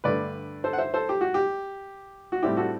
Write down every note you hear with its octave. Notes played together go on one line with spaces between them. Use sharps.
G2 D3 A3 B4 D5
A4 C5
F#5
C5 E5
A4 C5
G4
F#4
G4
F#4
A2 G3 C4 E4 G4
F#4 A4